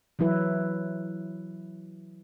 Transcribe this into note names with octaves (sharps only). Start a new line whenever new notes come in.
E3 F#3 E4 B4